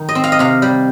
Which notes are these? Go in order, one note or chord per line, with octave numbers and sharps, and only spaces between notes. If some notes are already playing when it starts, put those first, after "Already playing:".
Already playing: D#3
D#5
C4
F5
D#5
C3 F5
G3